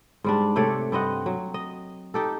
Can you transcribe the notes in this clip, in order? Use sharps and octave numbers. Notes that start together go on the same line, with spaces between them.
G#2 G3 D4
C3 A3 C#5 D5
G2 C4 D#5 F#5
F#3
D#5
D#4 G4 A4